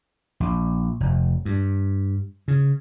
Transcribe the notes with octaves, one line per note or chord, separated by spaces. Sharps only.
A#1
F1
G2
C#3